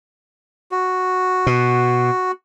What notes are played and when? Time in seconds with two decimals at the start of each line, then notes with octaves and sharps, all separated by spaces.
0.72 F#4
1.47 B2